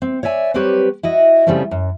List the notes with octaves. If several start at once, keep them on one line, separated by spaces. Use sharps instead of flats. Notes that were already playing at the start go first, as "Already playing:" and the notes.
C4
C#5 D5 E5 G#5
F#3 G3 C4 G4 B4 C#5
E4 F#4 D#5
C#3 F3 G3 A3 C4 C#4
F#2